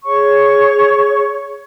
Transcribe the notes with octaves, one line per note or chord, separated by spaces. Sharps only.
G#4 C#5 C#6